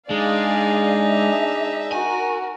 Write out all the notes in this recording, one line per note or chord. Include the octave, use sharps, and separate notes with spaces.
G#3 D4 D#4 G#4 D5 F5 G#5
E5
F#4 A#4 G#5